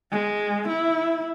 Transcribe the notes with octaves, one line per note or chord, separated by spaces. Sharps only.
G#3
E4